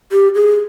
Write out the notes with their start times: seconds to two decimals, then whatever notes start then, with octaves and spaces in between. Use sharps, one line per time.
0.12 G4
0.35 G#4